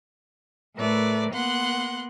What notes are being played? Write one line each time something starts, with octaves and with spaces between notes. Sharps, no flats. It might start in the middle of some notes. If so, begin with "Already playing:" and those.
A2 A3 A#4 B4 D5
A#3 B3 F#5 C6 F#6